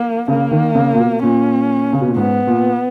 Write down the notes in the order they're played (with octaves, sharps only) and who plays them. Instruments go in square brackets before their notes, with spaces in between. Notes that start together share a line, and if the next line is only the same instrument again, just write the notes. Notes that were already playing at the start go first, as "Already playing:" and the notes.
Already playing: [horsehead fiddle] A#3
[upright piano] C#3 [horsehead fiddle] A#3
[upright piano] D#3
C#3
A#2
B2
[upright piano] A#2 [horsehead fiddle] C#4
[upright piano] C#3
B2
A#2
[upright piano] G#2 [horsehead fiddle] B3
[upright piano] A#2